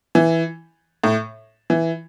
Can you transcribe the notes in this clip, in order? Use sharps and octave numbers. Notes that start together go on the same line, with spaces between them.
E3
A2
E3